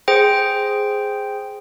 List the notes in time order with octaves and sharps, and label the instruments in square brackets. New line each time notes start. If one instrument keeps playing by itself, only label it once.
[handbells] G#4 C5 G5